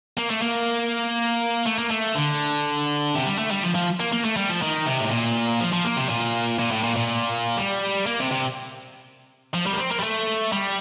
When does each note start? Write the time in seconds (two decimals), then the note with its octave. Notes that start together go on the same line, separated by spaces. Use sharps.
0.18 A#3
0.31 A3
0.42 A#3
1.66 A3
1.79 A#3
1.91 A3
2.15 D3
3.14 C3
3.26 G3
3.38 A3
3.51 G3
3.63 F3
3.75 F3
4.00 A#3
4.13 A#3
4.25 A3
4.37 G3
4.49 F3
4.62 D#3
4.86 C3
5.01 A2
5.11 A#2
5.61 F3
5.73 F3
5.85 A#3
5.97 C3
6.10 A#2
6.59 A#2
6.71 A2
6.83 A#2
6.96 A#2
7.57 G3
8.06 A#3
8.19 C3
8.31 C3
9.54 F3
9.66 G3
9.73 A#3
9.79 C4
9.91 A#3
10.00 G3
10.03 A3
10.53 G3